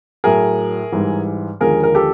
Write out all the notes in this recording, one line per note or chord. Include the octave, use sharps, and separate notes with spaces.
A2 F#3 G#4 A#4
G#2 E3 G3
D#2 D3 F3 G#3 G#4 A#4
A#4
G4 A4